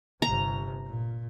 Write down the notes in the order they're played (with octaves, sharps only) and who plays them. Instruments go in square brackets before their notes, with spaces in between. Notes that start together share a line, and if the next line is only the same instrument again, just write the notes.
[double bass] G1 C3 [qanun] A#5
[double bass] A#2